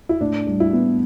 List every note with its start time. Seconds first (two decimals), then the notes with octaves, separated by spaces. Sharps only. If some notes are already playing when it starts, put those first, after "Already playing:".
0.09 E4
0.21 A2 D4
0.47 G3
0.60 E4
0.73 B3